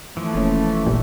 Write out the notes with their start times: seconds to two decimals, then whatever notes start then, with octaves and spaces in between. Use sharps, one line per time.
0.17 E3 F3 A3
0.34 E1 A#3 C#4
0.86 A1 G2 A#2 G3